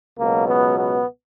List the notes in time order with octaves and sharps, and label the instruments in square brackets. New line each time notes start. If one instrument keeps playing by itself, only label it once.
[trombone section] C#2 B2 F#3 A#3
B3
B3